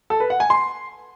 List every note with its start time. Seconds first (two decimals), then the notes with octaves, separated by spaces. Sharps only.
0.10 A4
0.20 B4
0.30 F#5
0.40 G#5
0.50 C6